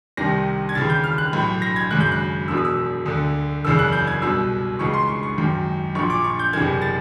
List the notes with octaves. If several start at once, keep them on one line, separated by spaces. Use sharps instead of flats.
C2 C3 D#3 A#6
G#6
D#2 C#3 E3 A6
G6
F6
F#6
B1 A2 E3
A#6
G#6
G#1 F#2 C#3 F#6
G6
F#6
E1 E2 B2 E6
D#6
E6
D2 D3
F#1 E2 C#3 E6
F#6
G6
G#6
C2 B2 E6
C#2 C#3 E3 C#6
C6
C#6
C#6
G#1 F#2 D#3
A#1 A#2 C#6
D6
C#6
G6
F#1 E2 C3 E3 G#6
A6